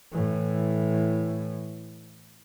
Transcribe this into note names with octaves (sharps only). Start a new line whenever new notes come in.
A2 E3